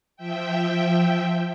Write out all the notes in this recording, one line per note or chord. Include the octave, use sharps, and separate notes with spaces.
F3 E5 G5